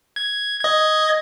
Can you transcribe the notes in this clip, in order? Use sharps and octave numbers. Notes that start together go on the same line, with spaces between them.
G#6
D#5 G#6